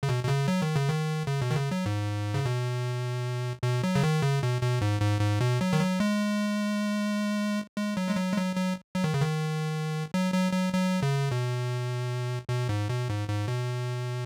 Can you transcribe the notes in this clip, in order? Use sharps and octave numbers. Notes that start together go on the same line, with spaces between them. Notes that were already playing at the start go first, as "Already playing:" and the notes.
C#3
B2
B2
C#3
F#3
D#3
C#3
D#3
C#3
B2
D#3
C#3
F#3
G#2
C#3
B2
B2
F#3
C#3
D#3
C#3
B2
B2
G#2
G#2
G#2
B2
F#3
D#3
F#3
G#3
G#3
F#3
G#3
F#3
G#3
F#3
F#3
F#3
D#3
C#3
D#3
F#3
F#3
F#3
F#3
C#3
B2
B2
G#2
B2
G#2
G#2
B2